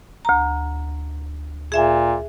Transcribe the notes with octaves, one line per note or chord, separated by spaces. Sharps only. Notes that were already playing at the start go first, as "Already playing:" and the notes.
D2 A#5
A#2 G#4 E5 G#5